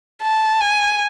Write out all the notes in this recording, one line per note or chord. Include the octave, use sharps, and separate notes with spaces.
A5
G#5